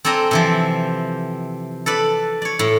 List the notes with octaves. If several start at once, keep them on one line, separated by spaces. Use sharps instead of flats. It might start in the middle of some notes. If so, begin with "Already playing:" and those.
C4 A4 D5 G#5 A#5
C3 E3 F3
A4 B4 D5
C#5 D5
A2